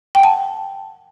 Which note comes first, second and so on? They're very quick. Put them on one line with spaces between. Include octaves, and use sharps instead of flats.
G5 F#5 A5